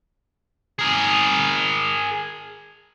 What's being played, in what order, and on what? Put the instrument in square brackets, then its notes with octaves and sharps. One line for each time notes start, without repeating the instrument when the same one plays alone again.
[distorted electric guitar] G#4 A#4